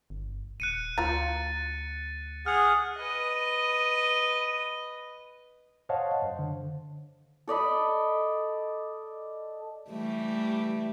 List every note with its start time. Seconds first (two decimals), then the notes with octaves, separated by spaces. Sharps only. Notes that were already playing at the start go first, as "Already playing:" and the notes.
0.10 G1
0.60 D#1 F#6 C#7 D#7
0.98 D2 F4 A#5 A6
2.46 G#4 F#5 F6 F7
2.96 B4 D#5
5.89 C5 C#5 D#5 F5 F#5 A5
6.22 F#2 C5
6.39 D3
7.48 A4 D5 D#5 B5
9.90 E3 G3 A3